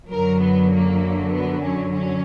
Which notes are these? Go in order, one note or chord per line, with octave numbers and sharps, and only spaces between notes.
F#2 D3 F#3 A#4
B3
A#3
B3
C#4
C#4